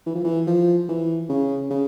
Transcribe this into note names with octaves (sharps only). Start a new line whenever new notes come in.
E3
F3
E3
F3
E3
C#3
C#3